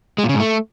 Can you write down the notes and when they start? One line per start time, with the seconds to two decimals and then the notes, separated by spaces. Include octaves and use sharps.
0.18 G#3
0.24 A#2
0.29 C#3
0.34 G#2
0.40 A3